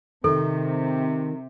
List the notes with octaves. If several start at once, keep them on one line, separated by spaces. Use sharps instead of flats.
C3 D#3 A4